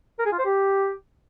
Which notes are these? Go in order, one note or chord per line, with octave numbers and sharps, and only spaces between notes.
A#4
G#4
F4
C5
G4